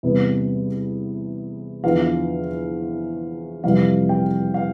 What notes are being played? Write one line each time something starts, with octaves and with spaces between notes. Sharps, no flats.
E2 C3 G3 B3
E2 D3 F3 F5
F2 C3 E3 G3 F5
G5
F5